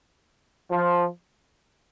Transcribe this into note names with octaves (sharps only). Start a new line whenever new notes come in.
F3